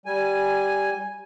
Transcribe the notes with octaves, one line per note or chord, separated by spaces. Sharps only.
G3 G#5